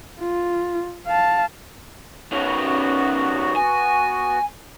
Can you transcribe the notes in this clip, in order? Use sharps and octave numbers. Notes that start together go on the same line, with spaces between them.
F4
F5 A5
D#3 B3 C#4 F#4
G#5